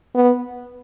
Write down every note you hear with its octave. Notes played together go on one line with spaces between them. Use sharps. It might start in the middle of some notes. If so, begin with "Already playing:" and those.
B3